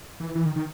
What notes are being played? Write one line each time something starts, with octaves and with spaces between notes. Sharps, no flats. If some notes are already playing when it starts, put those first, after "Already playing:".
E3
E3
D#3
D#3